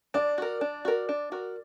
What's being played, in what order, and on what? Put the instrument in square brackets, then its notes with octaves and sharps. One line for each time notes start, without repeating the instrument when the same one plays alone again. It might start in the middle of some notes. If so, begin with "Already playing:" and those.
[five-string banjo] D4 [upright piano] D5
[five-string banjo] F#4 A#4
D4
F#4 A#4
D4
F#4 A#4